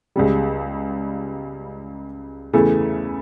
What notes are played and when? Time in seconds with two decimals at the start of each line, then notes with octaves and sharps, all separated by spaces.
0.16 C#2 C#3 G3
2.53 E2 C#3 E3 A3